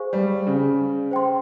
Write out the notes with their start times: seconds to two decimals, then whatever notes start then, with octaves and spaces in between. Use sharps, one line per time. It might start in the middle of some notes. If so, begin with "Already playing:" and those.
Already playing: G#4 C5 F5 G#5 C#6
0.13 G3
0.47 C#3
1.11 C5 G5 C6